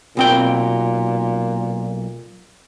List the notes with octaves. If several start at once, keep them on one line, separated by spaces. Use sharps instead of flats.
B1 A#2 C4 G5